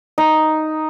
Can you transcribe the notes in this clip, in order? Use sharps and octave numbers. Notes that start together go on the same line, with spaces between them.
D#4